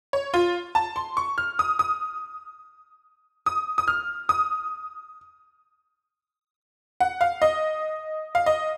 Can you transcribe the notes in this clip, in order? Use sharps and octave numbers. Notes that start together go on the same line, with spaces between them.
C#5
F4
A5
C6
C#6
F6
D#6
D#6
D#6
D#6
F6
D#6
F#5
F5
D#5
F5
D#5